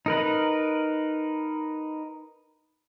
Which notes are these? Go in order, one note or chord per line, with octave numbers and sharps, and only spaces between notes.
D#4 A#4 B4